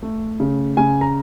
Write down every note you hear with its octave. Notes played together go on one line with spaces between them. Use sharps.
A3
C#3
C#3 G#5
A#5